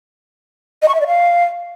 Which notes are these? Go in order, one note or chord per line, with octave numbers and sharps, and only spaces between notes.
D#5
C#6
E5
D5
F5